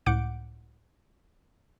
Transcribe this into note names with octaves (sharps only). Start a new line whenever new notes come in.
C#2 A2 F#5 D6 G6 D7